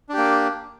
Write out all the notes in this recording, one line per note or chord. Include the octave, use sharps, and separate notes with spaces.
A#3 D4 G4